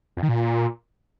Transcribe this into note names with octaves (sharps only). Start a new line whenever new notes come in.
F2
D#3
A#2